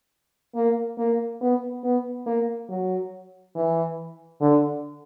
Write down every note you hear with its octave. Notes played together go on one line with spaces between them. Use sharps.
A#3
A#3
B3
B3
A#3
F#3
E3
D3